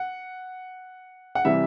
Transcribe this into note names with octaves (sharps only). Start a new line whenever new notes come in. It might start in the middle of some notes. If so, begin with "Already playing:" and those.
Already playing: F#5
F#5
C3 E3 G3 E5